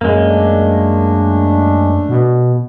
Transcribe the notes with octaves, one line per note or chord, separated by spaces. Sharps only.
F#2 G#3 A#3
A3 D4
B2